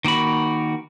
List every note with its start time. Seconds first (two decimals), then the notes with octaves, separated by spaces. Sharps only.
0.05 D#3 A#3 F#4 B5